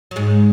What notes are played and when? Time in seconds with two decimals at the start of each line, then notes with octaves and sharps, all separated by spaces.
0.11 F#3
0.16 G#2 G#3